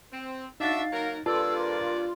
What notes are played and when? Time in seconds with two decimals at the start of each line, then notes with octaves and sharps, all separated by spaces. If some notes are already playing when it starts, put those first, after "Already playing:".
0.13 C4
0.60 D4 D#4 F#4 E5 F5 A6
0.92 F#3 A#3 A#4
1.26 G2 A#3 F4 A4 B4 D5 A5 E6
1.58 A#4